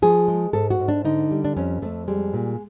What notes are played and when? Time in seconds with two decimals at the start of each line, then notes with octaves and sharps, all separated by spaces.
0.02 F3 G#4
0.28 G#3
0.53 G#2 A4
0.70 F#4
0.79 G#2
0.88 D4
1.05 D3 D#4
1.31 G3
1.45 D4
1.56 F2 C#4
1.82 F2 A3
2.08 G3 G#3
2.34 A#2